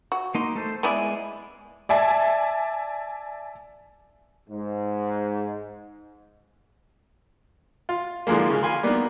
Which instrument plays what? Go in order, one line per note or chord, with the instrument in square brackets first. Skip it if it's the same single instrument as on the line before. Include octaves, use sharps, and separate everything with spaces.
[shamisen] F#4
[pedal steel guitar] A#3 D#4 C6
A3 A4 C5
[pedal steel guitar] G#3 G#5 [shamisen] B3 E4 D5
[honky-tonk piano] D5 E5 G#5 A5
[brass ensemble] G#2
[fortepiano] F4
D3 E3 F3 G#3 A#3
C#3 G#3
A#4 F5 G#5 B5 C6
G3 A#3 B3 D4 D#4